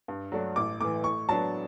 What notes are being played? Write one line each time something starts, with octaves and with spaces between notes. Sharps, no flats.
G2
F#3 A3 D4
A1 D6
A2 E3 D6
A2 C#6
F#3 B3 D4 A5